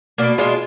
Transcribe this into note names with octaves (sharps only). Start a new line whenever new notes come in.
B2 A#3 D4
G#3 D4 F4